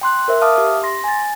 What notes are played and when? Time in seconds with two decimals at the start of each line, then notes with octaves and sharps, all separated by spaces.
0.01 G5 C6 F#6
0.28 A#4 C5 E5
0.42 E5 F5 A5 D6 D#6 F6
0.58 G4
0.83 C6 A#6
1.04 G#5 A6